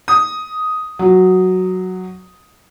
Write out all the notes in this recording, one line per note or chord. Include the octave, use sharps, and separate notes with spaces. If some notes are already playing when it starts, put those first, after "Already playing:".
D#6
F#3